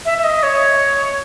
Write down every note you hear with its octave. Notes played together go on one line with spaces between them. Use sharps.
E5
E5
D#5
C#5